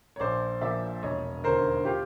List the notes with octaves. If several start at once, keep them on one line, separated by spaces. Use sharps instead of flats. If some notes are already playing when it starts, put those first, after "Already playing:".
C#5
A#1 C5 D5
A#2 F3 D5 E5
E1 C#5 D#5
D#2 D3 A#4 C5
F4 G4